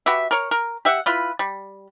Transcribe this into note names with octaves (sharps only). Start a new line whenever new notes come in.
F#4 G4 B4 E5
A#4 C#5
A#4
G4 E5 F#5
E4 F4 B4
G3